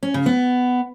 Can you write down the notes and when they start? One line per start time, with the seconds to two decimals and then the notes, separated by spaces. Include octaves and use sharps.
0.03 C#4
0.14 C#3
0.26 B3